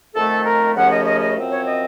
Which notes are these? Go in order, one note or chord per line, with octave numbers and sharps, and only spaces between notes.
F2 D#3 A3 C4 A4
A#4
D#2 C#3 F3 A3 C#4 F#5
D#5
D#5
D#5
F#2 F3 C4
C#5
D#5